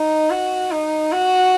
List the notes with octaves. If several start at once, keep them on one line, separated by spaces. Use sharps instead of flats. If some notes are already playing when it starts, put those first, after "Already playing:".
Already playing: D#4
F#4
D#4
F#4